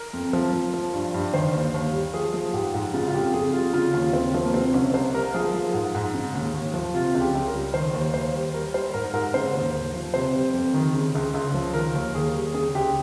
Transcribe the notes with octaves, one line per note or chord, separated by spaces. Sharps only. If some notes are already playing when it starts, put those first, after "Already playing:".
Already playing: A#4
F2
F3
F3
F3
G2
G2
D#3 C5
D#2
D#2
G3
F3 G#4
F3
G#2 G4
G#2
C#3 F4
F4
F2 G4
F2 G#4
G3 F4
C#3 F4
D#2 F4
D#2 C4
F3 C4
A#3
C3 C4
C2 C#4
C2 C5
G3 A#4
F3 G#4
F3
G#2
G#2
C#3
D#2
D#2
F3
C3 F4
C#2
G4
C#2
A#4
G3
D#3 C5
D#2
D#2 C5
G3
G3 A#4
G3 C5
G#2 A#4
G#2 A#4
C#3 C5
D#2
D#2
F3
C3 C5
G3
F2
D#3
C#3
C#2
C#2
F3
D#3 A#4
D#2
D#2 G#4
G3
C#3 G#4
C#2 G4